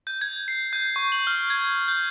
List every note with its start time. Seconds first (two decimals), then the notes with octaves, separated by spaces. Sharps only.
0.07 G6
0.21 G#6
0.48 C7
0.73 G6
0.96 C#6
1.12 F#7
1.27 F6
1.50 G#6
1.88 G6